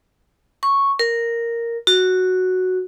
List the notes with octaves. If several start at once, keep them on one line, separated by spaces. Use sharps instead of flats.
C#6
A#4
F#4